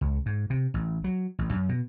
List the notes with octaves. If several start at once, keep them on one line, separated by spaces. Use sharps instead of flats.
C#2
G#2
C3
A1
F#3
A1
F#2
B2